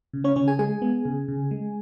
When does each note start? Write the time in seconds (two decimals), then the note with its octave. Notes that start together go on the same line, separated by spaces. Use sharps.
0.13 C#3
0.24 C#4 C#5
0.36 C#3 C#4 C#5
0.48 G#4 G#5
0.59 G#3 G#4 G#5
0.82 B3
1.05 C#3
1.28 C#3
1.51 G#3